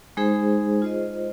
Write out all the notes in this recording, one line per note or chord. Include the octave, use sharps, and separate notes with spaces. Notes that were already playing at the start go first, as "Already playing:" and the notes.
G#3 D#4 G#4 C5
F4 C5 D#5